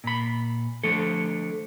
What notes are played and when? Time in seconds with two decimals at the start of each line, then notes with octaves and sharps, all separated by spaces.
0.04 A#2 B5
0.83 D3 F3 A3 A4